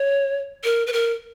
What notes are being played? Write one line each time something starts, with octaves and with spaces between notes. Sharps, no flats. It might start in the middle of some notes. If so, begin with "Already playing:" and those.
Already playing: C#5
A#4
B4
A#4